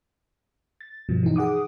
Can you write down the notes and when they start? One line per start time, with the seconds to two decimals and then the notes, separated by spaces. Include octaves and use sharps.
0.81 A6
1.09 G2 B2 F3
1.23 E3 D#4
1.36 G#4 F#5 D6 D#6